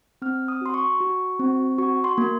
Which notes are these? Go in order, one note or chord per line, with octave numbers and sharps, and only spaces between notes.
C4 F6
D#6
F#4 C6
C#6
F#4
C4
F#4 C#6
C6
A#3